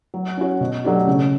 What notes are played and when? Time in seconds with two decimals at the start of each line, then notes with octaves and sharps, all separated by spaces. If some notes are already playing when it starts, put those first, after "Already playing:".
0.14 F#3
0.37 C#4 F#4
0.61 B2
0.84 F#3 A3 D4 G4
1.07 C#3